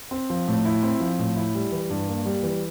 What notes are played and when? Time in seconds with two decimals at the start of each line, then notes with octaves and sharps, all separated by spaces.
0.11 C4
0.30 F3
0.48 A2
0.65 E4
0.83 C4
1.00 F3
1.19 A2
1.36 E4
1.55 G3
1.72 E3
1.90 G2
2.08 A#3
2.26 G3
2.43 E3